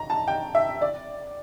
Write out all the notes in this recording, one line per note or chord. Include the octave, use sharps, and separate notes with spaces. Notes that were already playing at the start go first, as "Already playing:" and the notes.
Already playing: A#5
A5
G5
E5
D5